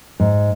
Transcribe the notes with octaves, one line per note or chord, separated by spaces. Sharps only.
G#2